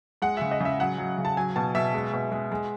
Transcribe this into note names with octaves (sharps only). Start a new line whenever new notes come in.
G#3 F#5
C#3 E5
D#5
C#3 E5
F#3 F#5
F#3
C#3
A5
F#3 G#5
B2 A5
B2 E5
G#3
B2
G#3
G#3